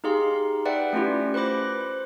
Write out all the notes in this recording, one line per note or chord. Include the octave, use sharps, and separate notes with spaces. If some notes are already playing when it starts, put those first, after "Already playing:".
D#4 G4 G#4 F5 C6
B4 D5 E5 F#5 G5
A3 C#4 E4 F4 G4
B4 C5 B5 D6 A#6
C5